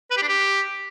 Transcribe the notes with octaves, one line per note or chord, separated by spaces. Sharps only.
B4
G4
D4
G4